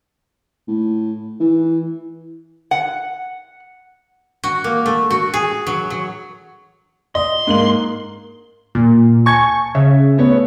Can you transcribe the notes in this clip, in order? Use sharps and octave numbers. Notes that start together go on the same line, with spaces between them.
A2
E3
F#5
F#4
A#3
A3
F#4
G#4
F#3
F#3
D#5 C6
G#2 A#3 F#7
A#2
G#5 A5 C#6 G#6
C#3 E5
A3 B3 C#5